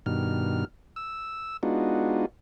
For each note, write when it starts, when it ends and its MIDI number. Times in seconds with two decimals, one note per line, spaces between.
0.06 0.65 43
0.06 0.65 47
0.06 0.65 51
0.06 0.65 89
0.96 1.57 88
1.63 2.26 56
1.63 2.26 59
1.63 2.26 62
1.63 2.26 63
1.63 2.26 65
1.63 2.26 66